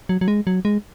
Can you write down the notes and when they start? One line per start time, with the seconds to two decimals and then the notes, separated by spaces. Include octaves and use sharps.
0.09 F#3
0.21 F#3
0.28 G#3
0.47 F#3
0.65 G#3